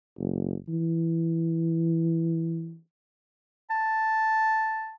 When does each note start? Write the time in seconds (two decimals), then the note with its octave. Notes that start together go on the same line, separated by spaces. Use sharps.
0.19 F#1
0.69 E3
3.70 A5